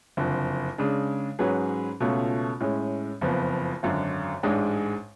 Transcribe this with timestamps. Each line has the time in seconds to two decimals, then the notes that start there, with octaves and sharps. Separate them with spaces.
0.17 F#1 F2 D3
0.78 C#3 G#3 D4
1.39 G#2 F#3 C#4 G#4 B4
2.00 C#2 B2 A3 C#4 F4
2.60 A2 G#3 C#4
3.21 F#1 F2 F3 B3
3.83 G#1 F#2 D3
4.43 A1 G#2 G#3 D4 G#4